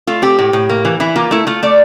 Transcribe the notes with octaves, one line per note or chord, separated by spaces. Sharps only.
A3 F4
C4 G4
A2
A2
A#3
E3
E3 E4
A#3 F4
A3 E4
A3 F4
A3 D5